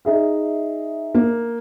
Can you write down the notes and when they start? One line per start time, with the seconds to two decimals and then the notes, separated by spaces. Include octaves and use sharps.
0.05 D#4 G#4 E5
1.15 A#3